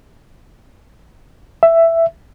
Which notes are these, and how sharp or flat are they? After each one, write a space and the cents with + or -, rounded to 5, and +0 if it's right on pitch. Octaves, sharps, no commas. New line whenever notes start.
E5 +10